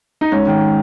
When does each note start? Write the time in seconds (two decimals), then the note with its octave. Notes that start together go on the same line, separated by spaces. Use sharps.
0.21 D#4
0.32 G#2 C#4
0.47 D#3